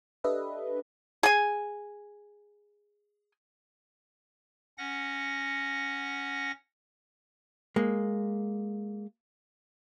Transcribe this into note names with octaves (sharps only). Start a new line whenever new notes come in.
D4 G4 A4 B4 D#5 E5
G#4 G#5
C#4 F#5 A#6
G#3 A#3